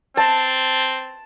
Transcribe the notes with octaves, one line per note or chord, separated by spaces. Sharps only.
C4 A5